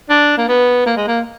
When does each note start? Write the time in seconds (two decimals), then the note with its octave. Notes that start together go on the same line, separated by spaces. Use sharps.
0.10 D4
0.38 A#3
0.48 B3
0.86 A#3
0.97 G#3
1.07 A#3